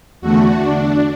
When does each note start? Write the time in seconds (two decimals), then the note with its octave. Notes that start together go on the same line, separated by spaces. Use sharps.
0.21 E2 D3 A3 F#4
0.59 D4